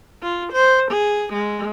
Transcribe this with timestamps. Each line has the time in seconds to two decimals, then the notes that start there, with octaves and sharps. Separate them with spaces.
0.22 F4
0.53 C5
0.91 G#4
1.33 G#3